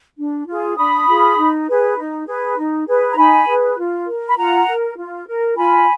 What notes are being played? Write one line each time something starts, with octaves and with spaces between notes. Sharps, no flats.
D4
F4 G#4
D4 B5 D#6
F4 G#4
D#4
G#4 B4
D#4
G#4 B4
D#4
G#4 B4
A#5
D#4 G#5 B5
G#4 B4
F4
A#4
B5
F4 F#5 A#5
A#4
F4
A#4
F4 G#5 B5